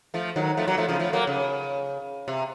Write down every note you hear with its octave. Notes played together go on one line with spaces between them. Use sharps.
F3 A3
D#3 F#3
F3 A3
F#3 A#3
F3 A3
C#3 F3
F3 A3
F#3 A#3
C#3
C3